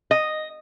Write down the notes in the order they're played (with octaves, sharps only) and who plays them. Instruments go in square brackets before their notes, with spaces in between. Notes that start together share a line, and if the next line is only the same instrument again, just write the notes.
[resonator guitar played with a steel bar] D#5